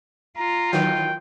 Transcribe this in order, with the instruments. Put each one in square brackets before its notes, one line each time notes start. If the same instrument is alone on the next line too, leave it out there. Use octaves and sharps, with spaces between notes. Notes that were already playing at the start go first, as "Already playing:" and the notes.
[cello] F4 [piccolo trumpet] A#5
[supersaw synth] D#3 E3 F#3 [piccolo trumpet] G5